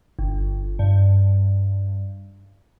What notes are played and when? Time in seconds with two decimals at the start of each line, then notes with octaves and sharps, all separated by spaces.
0.19 G1
0.79 G2